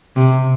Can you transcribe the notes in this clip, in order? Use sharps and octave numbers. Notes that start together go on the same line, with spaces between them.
C3